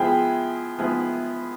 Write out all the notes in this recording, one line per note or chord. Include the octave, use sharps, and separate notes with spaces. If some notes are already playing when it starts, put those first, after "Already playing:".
Already playing: F3 G#3 B3 E4 G#4 G5
F3 G#3 B3 E4 G#4